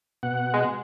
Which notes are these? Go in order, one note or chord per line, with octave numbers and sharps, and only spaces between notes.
B2 F#5
G#3